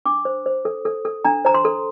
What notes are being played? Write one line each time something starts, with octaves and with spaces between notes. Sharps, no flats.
D4 D6
C5
C5
A4
A4
A4
D4 A#5
C5 A#5
C6
A4